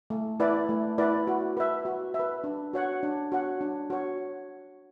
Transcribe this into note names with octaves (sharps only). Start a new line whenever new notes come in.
A3
E4 B4 D5
A3
E4 B4 D5
F#4
B4 E5
F#4
E5
B4
D4
F#4 C#5 F#5
D4
F#4 C#5 F#5
D4
F#4 C#5